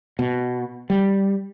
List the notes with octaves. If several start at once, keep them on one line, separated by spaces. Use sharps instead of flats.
B2
G3